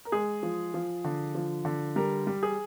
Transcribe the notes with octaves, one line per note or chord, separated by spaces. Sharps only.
A#4
G#3 G#4
F3
F3
D3
F3
D3
G3 A#4
G3
G#4